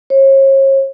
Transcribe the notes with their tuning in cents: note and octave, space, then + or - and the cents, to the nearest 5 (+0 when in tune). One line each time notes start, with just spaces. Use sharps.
C#5 -40